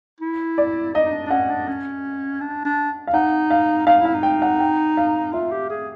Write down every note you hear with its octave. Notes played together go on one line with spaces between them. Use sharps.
E4
D5
D#4 D#5
D#4
D4
D4
C#4 F#5
D4
C#4
D4
D4
F5
D#4 F#5
F5
D#4 F5
E4 F5
D#4
G5
F#5
G5
F5
F4 E5
G4
G#4